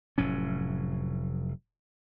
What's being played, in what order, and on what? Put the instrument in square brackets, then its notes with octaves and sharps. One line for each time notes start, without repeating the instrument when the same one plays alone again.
[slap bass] F1 A2 F#3 C#4